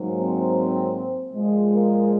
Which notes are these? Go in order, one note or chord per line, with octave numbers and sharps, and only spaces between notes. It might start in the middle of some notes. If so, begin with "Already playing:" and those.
Already playing: G#2 F#3 A#3
C4
A#2 F3 G#3
A#3 A#4